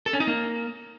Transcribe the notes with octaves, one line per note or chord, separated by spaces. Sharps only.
A4
C#4
D#4
A#3